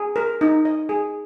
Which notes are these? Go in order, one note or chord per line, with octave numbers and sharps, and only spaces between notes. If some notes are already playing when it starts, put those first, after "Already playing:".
Already playing: G#4
A#4
D#4
D#5
G#4